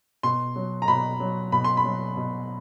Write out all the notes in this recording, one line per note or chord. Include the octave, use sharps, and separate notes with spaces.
B2 C6
F#3
A#5
B2 B5
F#3
B2 B5
C6
B5
F#3
B2